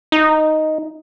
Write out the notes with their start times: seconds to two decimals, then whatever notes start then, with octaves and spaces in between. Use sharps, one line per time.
0.12 D#4